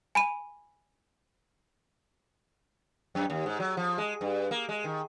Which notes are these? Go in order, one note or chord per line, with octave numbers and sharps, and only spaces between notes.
G#5 B5 D#7
F#2
D#2
G#2
F#3
F3
G#3
G2
A#3
G#3
D#3